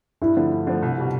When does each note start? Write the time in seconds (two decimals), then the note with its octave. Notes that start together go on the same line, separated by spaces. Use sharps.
0.21 G2 E4
0.37 D3 F3 A3
0.52 G2
0.67 D3 F3 A3
0.82 C2
0.98 B2 G3